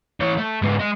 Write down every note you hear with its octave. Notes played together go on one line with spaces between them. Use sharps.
E3 C#5
A3
G#2 B3
G#3 D#5